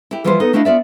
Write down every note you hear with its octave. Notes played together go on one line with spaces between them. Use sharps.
E4 G4
E3 F3 G3 F4 F#4 C5
B3 D#4 A4
A3 D4 E4 D#5 F5
B3 F4 D5 E5